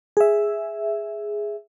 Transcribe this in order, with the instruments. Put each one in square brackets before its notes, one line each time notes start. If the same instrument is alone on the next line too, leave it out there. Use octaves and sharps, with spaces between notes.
[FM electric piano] G#4 E5